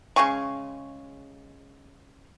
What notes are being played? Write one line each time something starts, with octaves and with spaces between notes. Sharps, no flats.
C#3 G#3 G#5 C#6